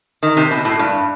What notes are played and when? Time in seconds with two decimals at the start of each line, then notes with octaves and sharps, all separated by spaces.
0.23 D#3
0.37 C3
0.51 B2
0.65 A2
0.79 G2